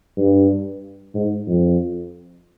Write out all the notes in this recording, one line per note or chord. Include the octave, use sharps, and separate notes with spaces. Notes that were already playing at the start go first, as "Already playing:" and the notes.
G2
G#2
F2